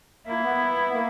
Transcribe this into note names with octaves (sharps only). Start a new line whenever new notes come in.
A#3 E4
B3
A#3